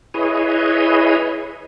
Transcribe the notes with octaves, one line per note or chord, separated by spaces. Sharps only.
E4 G#4 B4 C#5 D#5